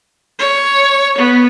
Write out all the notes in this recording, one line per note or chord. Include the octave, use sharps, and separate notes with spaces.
C#5
B3